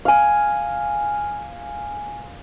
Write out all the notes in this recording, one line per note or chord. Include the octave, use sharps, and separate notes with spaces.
F5 G#5